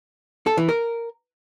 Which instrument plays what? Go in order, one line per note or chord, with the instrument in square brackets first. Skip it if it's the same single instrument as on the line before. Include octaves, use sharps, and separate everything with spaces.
[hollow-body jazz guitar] A4
E3
A#4